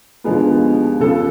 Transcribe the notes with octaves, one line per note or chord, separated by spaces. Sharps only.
D#2 D3 F3 G#3 B3
C#2 C#3 F3 A4